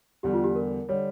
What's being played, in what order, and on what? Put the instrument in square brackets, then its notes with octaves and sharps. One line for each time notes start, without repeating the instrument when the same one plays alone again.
[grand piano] E2 D3 G3 [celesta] G4
[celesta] F4
G4
A#4
[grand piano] D3 G3 [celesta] C#5